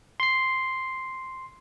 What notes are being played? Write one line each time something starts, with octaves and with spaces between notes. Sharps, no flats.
C6 C7